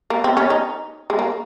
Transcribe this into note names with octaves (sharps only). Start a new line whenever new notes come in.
A#3
C4
C#4
D#4
G#3
A#3